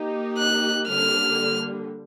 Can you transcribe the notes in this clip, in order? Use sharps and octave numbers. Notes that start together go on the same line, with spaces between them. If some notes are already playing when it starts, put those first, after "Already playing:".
Already playing: A#3 D#4 G4
F#6
D3 G3 A#3 F6